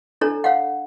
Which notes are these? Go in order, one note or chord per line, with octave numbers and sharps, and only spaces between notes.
D4 A4 C#5 A#5
C#5 F5 F#5